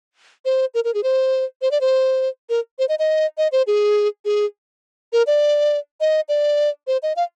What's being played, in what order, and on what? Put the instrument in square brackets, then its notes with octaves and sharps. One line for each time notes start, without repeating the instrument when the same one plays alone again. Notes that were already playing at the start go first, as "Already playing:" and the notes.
[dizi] C5
A#4
A#4
G#4
C5
C5
D5
C5
A#4
C5
D#5
D#5
D#5
C5
G#4
G#4
A#4
D5
D#5
D5
C5
D#5
F5